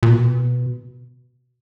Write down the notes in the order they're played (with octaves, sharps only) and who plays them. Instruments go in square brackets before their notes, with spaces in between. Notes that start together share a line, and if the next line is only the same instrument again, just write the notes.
[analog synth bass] A#2
B2